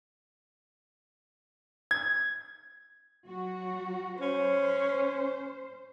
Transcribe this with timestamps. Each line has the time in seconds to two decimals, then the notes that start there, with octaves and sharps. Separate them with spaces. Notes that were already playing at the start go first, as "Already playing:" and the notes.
1.91 G#6
3.25 F#3 F#4
4.20 C#4 C5